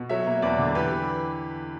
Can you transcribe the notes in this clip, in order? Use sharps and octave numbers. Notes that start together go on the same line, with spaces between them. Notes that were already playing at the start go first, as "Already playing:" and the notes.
Already playing: B2
F#3 C#5 E5
A#3
E2 B4 D5
D3
E3 G4 B4